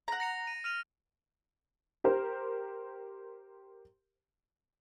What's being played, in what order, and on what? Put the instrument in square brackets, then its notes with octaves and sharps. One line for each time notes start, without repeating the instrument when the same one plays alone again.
[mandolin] F#5 A#5
[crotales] A#6 C#7 F7
D#7
F6 D#7 F7
[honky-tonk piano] G4 A#4 C5